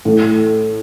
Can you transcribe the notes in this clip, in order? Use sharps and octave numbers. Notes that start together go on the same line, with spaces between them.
A2